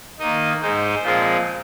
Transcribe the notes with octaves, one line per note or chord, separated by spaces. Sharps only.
D#3 A#3 D#4 D#5
G#2 G#3 D#4 C5
A#2 F3 G#3 C4